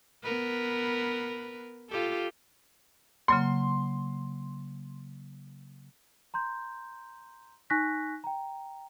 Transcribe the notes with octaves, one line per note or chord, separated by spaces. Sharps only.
B3 A#4 B4
F4 G4 A4
C#3 F#3 A#3 C6
A#5 C6 G6
D#4 G#5 C#6 F#6 A#6 B6
G5 A#5